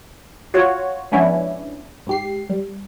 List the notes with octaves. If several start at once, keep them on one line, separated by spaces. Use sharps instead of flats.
F4 F#4 C#5 F#5
F3 G#3 B3 C#4 D4 E4
G#2 G4 C7
G3